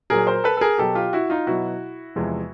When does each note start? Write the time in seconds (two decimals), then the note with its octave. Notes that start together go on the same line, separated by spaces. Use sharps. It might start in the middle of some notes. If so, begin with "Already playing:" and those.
0.10 A#2 F#3 G#4 A#4
0.27 A#4 C5
0.44 A4 B4
0.57 A4
0.61 G#4 A#4
0.78 B2 F#3 G4 A4
0.95 F4 G4
1.13 E4 F#4
1.30 D#4 F4
1.47 B2 F#3 E4 F#4
2.16 E2 C3 F3 G#3